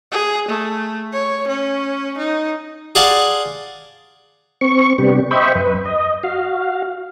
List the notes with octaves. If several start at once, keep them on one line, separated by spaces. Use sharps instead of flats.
G#4
A3
C#5
C#4
D#4
G#4 D5 F5 F#5 A5 C6
C4 C#6
C3 G3 B3 D4 G4
C5 D#5 E5 G5 B5 C#6
F#2 B4
D#5
F#4 F5